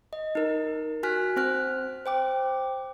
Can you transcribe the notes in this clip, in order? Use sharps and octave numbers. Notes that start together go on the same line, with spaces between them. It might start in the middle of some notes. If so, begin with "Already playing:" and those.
D#5
D#4 A#4
F#4 G#5 F6 F#6 B6
C4 C5 F6 F#6
C5 G5 D6